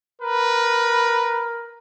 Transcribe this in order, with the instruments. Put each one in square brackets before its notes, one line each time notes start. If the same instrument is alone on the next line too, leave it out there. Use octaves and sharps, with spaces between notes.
[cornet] A#4 [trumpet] B4